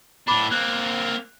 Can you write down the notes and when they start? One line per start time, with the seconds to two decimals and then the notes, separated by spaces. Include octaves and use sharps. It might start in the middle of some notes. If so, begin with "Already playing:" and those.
0.28 A2 D4 B5 D6
0.51 A#3 C4 F#6